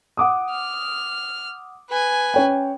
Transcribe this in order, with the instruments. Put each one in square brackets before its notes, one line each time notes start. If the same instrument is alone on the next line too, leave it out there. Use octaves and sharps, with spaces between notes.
[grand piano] F#5 D6 D#6
[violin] F6
B4 G#5
[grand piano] C#4 C#5 G5